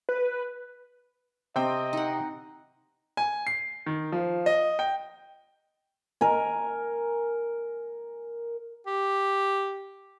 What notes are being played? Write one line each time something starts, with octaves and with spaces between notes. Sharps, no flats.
B4
C3 C4 D#5 G5
D#4 F#5
G#5
C7
D#3
F3
D#5
G5
A#4 G#5
G4